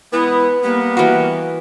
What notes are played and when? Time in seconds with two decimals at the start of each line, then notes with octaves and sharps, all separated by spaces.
0.13 E3 G#3 B3 E4 B4
0.64 G3 A#3 B3
0.97 E3 F#4 F#5